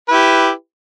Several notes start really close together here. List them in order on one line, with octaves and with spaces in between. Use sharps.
B4 E4 G4